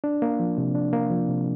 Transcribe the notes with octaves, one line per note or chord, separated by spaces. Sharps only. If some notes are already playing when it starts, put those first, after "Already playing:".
D4
A#3
F3
C3
D4
A#3
F3
C3